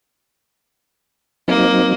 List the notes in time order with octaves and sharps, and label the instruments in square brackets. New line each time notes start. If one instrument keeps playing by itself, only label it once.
[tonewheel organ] F#3 C4 D#4 [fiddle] A#3